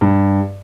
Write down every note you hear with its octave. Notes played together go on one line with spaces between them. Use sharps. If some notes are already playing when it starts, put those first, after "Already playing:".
G2